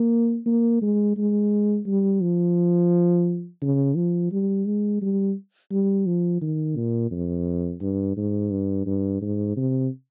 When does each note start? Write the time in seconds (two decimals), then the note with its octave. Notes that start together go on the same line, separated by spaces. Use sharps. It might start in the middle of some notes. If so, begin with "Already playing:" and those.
Already playing: A#3
0.46 A#3
0.82 G#3
1.17 G#3
1.86 G3
2.21 F3
3.62 C#3
3.96 F3
4.32 G3
4.66 G#3
5.02 G3
5.72 G3
6.06 F3
6.41 D#3
6.76 A#2
7.11 F2
7.81 G2
8.17 G#2
8.51 G2
8.86 G2
9.22 G#2
9.57 C3